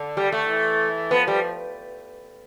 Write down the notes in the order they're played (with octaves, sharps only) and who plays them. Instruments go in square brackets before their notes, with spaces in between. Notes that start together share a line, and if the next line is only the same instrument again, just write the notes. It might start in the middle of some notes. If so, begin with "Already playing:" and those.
Already playing: [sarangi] D3
[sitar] G3
A3
[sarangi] E3
[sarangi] F3 [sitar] B3
[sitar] G3